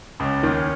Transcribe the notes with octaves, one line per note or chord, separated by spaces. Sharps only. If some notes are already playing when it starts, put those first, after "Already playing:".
C#2 C#3 C#4
D#2 D#3